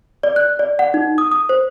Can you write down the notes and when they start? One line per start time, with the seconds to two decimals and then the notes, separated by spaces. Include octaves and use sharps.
0.23 D5
0.36 F#6
0.59 D5
0.79 F#5
0.94 D#4
1.18 D#6
1.32 D#6
1.49 C5